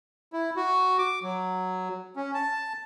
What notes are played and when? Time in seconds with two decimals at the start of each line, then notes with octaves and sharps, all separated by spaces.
0.33 E4
0.56 F#4
0.99 D6
1.23 F#3
2.16 C#4
2.34 A5